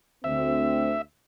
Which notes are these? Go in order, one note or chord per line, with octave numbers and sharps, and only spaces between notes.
D2 C4 E5